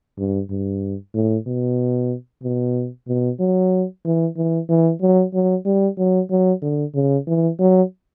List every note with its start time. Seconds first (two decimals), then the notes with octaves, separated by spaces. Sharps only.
0.18 G2
0.50 G2
1.15 A2
1.47 B2
2.43 B2
3.08 B2
3.40 F#3
4.05 E3
4.37 E3
4.69 E3
5.01 F#3
5.34 F#3
5.66 G3
5.98 F#3
6.30 F#3
6.62 D3
6.95 C#3
7.27 E3
7.59 F#3